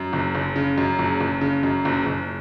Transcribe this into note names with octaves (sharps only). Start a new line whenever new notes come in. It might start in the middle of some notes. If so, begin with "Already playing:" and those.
Already playing: F#2
F#1
F#1
C#3
F#2
F#1
F#1
C#3
F#2
F#1
F#1